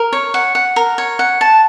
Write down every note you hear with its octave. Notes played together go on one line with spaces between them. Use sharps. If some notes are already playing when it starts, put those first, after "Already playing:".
Already playing: A#4
C#5
F#5
F#5
A#4
C#5
F#5
A5